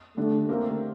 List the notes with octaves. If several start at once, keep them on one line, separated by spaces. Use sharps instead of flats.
D3 G3 A3 D4
D3 A3 A#3 C4 G4 A#4